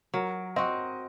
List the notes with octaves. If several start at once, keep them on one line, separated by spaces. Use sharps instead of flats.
F#3 A#4
C4 F#4 D#5